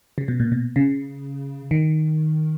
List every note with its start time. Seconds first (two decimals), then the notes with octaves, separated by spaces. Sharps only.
0.18 C#3
0.28 B2
0.40 A#2
0.52 B2
0.76 C#3
1.71 D#3